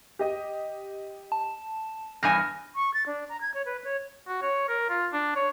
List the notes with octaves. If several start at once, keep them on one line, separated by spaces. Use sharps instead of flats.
G4 D#5
A5
E2 G2 G#5 F6 A#6
C#6
A6
D4
A#5
G#6
C#5
B4
C#5
F#4
C#5
A#4
F4
D4
C#5